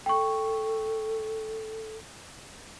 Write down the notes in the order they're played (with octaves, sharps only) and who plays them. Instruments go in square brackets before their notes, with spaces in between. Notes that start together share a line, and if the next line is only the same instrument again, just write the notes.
[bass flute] A4 [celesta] G5 C#6